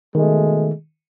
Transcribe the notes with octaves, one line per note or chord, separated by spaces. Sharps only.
B2 D#3 G#3 A3